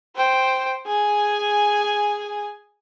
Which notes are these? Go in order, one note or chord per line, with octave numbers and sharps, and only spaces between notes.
C5 G5
G#4 G#5